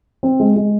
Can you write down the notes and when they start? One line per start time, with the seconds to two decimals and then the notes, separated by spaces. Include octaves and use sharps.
0.23 C4
0.40 G#3
0.56 G#3